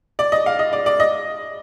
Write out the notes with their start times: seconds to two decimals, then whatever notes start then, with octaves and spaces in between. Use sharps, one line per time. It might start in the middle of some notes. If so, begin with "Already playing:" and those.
0.19 D5
0.32 D#5
0.46 F5
0.59 D#5
0.73 D5
0.86 D5
1.00 D#5